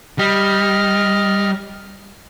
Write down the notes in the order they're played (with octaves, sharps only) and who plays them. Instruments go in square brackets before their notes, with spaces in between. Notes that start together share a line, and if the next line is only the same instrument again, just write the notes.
[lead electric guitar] G3 [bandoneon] D#5 F6